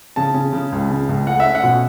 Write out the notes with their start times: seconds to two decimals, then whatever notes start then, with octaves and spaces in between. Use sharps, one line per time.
0.16 C#3 A5
0.34 C#3
0.53 C#3
0.72 C#2
0.90 C#3
1.09 C#2
1.27 A3 F#5
1.40 E5
1.45 C#4
1.55 F#5
1.63 B2